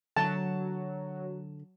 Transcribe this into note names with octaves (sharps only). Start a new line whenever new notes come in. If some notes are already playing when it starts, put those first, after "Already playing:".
D3 F#3 A5